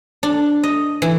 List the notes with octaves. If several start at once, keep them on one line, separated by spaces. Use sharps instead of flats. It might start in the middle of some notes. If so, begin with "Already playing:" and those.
D4
D#5
E3